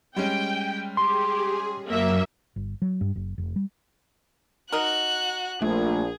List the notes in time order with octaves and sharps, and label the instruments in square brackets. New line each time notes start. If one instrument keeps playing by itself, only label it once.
[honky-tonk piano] G3 G#3 C#4 [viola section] G5
[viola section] G4 [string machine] G#4 [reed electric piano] C6
[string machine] F#2 F#3 [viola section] A#3 E5
[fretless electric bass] G1
F#3
G2
F#1
F1
G3
[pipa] D#4 A#4 [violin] F#4 F#6
[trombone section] A#1 [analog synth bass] A3 [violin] G#4